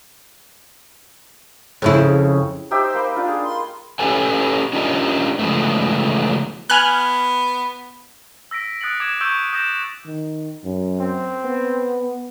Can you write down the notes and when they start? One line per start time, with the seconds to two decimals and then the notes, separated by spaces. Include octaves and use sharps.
1.82 F2 C#3 E4
2.71 D#4 G4 C5 E5
2.94 A#3 B4
3.16 D4 F4
3.28 G#4
3.44 C6
3.99 C#4 G4 A4 B4 G#5
4.73 C#4 D4 F4 G4 A#4 D#5
5.39 C#3 E3 F3 G#3 A3 B3
6.70 B3 G#5 F6 F#6
8.51 E6 A#6 B6 D7
8.81 D#6 F#6 A6 C#7 D7 F#7
9.00 D6 G#6 E7
9.21 C#6 E6 G6 D7 F7
9.53 D#6 G6 A6 A#6 D7 E7
10.06 D#3
10.64 F#2
11.00 C4
11.45 B3